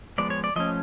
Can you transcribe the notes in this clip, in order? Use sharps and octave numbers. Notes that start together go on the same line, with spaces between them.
F3 G#3 B3 D5
C#5
D5
F3 A3 C#4 D#5